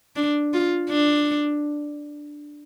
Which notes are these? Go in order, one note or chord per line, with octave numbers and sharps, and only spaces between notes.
D4
F4
D4